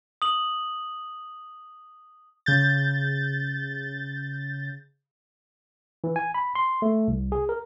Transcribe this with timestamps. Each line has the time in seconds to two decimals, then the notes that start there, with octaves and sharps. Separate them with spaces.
0.22 D#6 F#7
2.46 C#3 G6 A6
6.04 E3
6.16 G#5
6.34 B5
6.55 C6
6.82 A3
7.08 C2
7.32 G#4
7.49 A#4